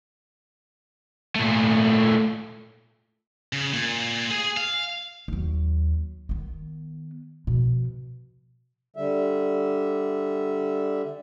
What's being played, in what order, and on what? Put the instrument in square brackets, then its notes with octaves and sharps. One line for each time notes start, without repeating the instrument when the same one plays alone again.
[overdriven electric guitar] A#2 A3
[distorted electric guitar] C#3
A#2
G#4
F5
[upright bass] D#2 F#3
D#3 B3
B2 F3
[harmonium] D3 G3 E5